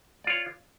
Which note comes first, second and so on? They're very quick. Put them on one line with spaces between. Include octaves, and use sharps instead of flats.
D5 F4 C#5